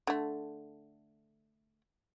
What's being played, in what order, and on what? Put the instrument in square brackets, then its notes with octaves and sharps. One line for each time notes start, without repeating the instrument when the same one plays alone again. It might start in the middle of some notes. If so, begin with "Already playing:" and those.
[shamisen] D3 A3